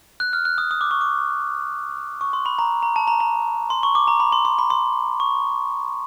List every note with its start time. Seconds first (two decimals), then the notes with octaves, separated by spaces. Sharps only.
0.20 F#6
0.33 F6
0.45 F#6
0.58 D#6
0.71 D#6
0.81 D6
0.91 C#6
1.01 D6
2.21 C#6
2.33 C6
2.46 B5
2.59 A#5
2.83 A#5
2.96 A5
3.07 A#5
3.20 A#5
3.70 C6
3.83 C#6
3.95 D6
4.08 A#5
4.20 B5
4.32 C6
4.45 C6
4.59 B5
4.70 C6
5.20 C#6